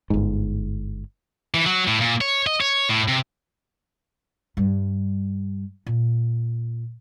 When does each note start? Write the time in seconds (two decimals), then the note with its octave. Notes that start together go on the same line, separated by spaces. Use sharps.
0.10 G1 G#2
1.54 E3
1.66 F#3
1.87 A2
2.01 A#2
2.21 C#5
2.47 D#5
2.61 C#5
2.89 A2
3.08 C3
4.57 G2 G3
5.86 A#2